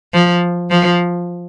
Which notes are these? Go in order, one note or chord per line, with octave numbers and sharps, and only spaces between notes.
F3
F3